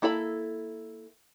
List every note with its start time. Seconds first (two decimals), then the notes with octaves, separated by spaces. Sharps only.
0.02 A#3 E4 A4 D5 B5